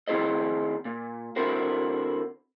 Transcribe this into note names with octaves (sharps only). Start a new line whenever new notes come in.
D#3 C4 E4 G#4 C5 D#5
A#2
D3 C4 E4 F#4 A#4 C5